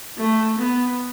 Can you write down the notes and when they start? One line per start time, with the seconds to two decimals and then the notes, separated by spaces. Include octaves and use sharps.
0.18 A3
0.59 B3